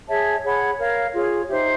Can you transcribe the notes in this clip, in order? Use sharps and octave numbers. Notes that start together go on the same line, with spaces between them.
G#4 C#5 E5 A5
G#4 C#5 F#5 B5
A#4 C#5 F5
F4 G#4 C#5
D#4 G4 C5 E5